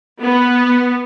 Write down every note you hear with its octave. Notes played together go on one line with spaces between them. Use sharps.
B3